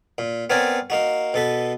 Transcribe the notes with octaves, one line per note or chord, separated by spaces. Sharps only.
A#2
B3 C4 A#4 C#5 D5 G#5
A#3 D#4 F#4
B2 A4 B4